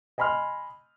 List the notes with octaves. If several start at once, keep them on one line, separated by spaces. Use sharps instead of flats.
D#5 G#5 B5 C6 F6